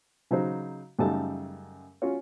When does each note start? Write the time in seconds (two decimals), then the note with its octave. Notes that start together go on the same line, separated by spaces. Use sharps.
0.31 C#3 F#3 D#4 C5
0.99 F#2 C#3 G3 A3 D#4 A5
2.02 C#4 F4 F#4 C#5